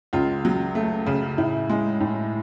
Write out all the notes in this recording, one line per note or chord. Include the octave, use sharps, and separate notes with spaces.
C#2 F4
F#3
A3
C#3
A2 E4
G#3
A2